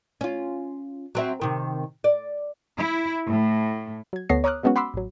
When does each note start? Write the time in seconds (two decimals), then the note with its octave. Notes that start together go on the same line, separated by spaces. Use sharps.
0.21 C#4 F4
1.15 F#3 C4 E5
1.42 C3 D#3
2.04 D5
2.77 E4
3.30 A2
4.13 F#3 G#6
4.29 D2 B3 A4 C#5 A#6 C7
4.44 C#5 A#5 D6 D#6 F6 F#6
4.63 F#3 G#3 B3 C#4 F#4
4.76 F#5 B5 C6 D6 E6
4.94 A1 F#3